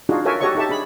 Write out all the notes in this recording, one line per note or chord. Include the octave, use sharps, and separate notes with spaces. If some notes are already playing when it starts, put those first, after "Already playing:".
D4 D#4 F4 F#4 G#4
F#4 A4 A#4 C#5 E5 G#5
F#4 G4 A4 C#5 D#5 C#6
D#4 G4 A4 E5 A5
D4 G#4 B5